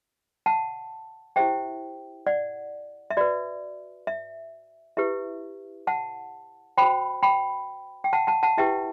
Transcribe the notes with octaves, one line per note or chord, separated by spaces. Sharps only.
F#5 A5
E4 G4 C5 E5 G5
D5 F#5
E5
F#4 B4 D5
E5
E4 G4 B4 E5
F#5 A5
F#4 C5 G5 B5
G5 B5
G5
F#5 A5
F#5 A5
F#5 A5
E4 G4 B4 E5 G5